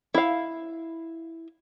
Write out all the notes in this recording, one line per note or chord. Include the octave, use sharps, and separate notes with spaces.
E4 F5